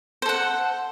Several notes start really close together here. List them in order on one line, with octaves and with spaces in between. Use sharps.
C5 A4 F#5